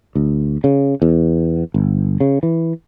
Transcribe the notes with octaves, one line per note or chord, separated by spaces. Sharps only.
D2
C#3
E2
G1
C#3
E3